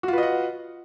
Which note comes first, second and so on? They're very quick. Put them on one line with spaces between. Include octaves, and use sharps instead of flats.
F#4 F4 B4 D#5 F#5